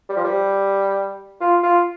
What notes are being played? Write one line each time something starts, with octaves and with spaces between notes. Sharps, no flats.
G3
F3
G3
F4
F4